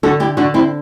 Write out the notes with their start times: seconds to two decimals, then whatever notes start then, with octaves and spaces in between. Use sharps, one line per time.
0.03 D3 F#4 A4
0.20 E4 G4
0.37 D3 D4 F#4
0.54 C4 E4